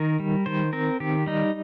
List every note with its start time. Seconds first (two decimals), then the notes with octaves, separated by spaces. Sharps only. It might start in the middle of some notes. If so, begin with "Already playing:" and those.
Already playing: D#3 A#4
0.20 G3
0.46 D#3 C5
0.73 C4 A#4
1.00 D#3 G4
1.26 G3 D#4